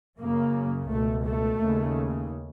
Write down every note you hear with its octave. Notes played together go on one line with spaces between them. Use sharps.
F#2 C#3 A#3
C#2 B2 A3
A3
D#2 C#3